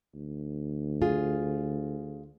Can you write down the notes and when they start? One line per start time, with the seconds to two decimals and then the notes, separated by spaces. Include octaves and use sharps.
0.14 D2
1.02 F4 G#4